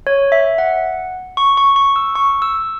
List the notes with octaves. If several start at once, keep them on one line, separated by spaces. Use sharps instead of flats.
C#5
E5
F#5
C#6
C#6
C#6
E6
C#6
E6